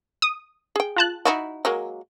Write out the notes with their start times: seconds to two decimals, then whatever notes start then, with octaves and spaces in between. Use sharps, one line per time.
0.22 D#6
0.76 G#4 G5
0.96 F4 A5 F#6
1.25 D#4 E4 F#4
1.65 F#3 G#3 A#3